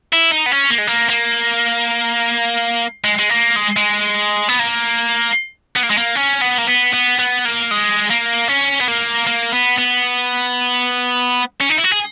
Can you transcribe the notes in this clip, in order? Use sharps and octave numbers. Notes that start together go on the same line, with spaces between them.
E4
D#4
B3
C#4
A#3
G#3
A#3
A#3
G#3
G#3
A#3
G#3
G#3
B3
A#3
B3
A#3
G#3
A#3
C#4
B3
A#3
B3
B3
B3
A#3
G#3
A#3
C#4
B3
A#3
A#3
B3
B3
C#4
D#4
E4
F#4
G#4